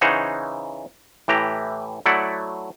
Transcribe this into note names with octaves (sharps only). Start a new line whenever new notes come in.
C#3 E3 D#4 C5 C#5 F#5
A2 E3 G4 A#5
F#3 A3 E4 D5 F#5